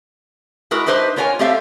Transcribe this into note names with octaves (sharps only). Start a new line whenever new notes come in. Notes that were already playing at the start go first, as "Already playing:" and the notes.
G#3 E4 F#4 A#4 B4
D4 D#4 G4 B4 C5 E5
A#3 F4 A#4 C#5 F#5 G#5
A3 C4 G4 A4 E5 F5